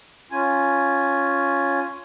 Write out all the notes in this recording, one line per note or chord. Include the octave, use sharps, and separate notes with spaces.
C#4 F4 G#5